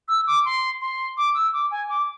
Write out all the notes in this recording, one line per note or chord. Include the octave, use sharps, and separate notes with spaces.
E6
D6
C6
C6
D6
E6
D6
G#5
D6